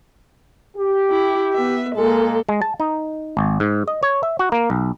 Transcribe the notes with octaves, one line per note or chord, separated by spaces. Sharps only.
G4
E4
B3 E5
A#2 G#3 A#3 A4
G#3
A5
D#4
G#1
G#2
D#5
C#5
E5
F#4
A#3
B1